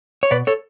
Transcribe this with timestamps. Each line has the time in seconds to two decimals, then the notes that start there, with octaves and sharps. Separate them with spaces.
0.23 C#5
0.31 B2 B4 D5
0.47 A4 C#5